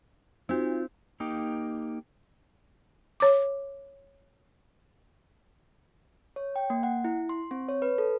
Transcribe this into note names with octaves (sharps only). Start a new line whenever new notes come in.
C4 D#4 F4 F#4
A#3 D#4 G4
C#5 D6
C#5
G5
A#3
F#5
E4
C6
C4
C#5
B4
A4